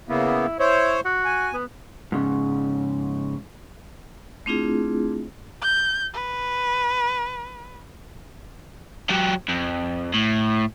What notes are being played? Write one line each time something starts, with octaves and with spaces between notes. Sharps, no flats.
C#3 A#3 B3 E4
E4 C5 C#5
F#4
G#5
B3
G#2 C#3
A3 C4 D4 E4 F4 G#4
G6
B4
F#3 G4
F2
A2